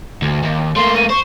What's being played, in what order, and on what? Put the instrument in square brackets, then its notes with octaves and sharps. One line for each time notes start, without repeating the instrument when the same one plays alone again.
[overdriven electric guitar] D2
D#2
[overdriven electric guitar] A3 A#3 [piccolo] C6
[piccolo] D#7
[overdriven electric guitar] C5 [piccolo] C#6